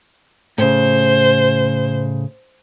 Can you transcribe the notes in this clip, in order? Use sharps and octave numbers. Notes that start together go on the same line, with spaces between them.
A2 C#3 C5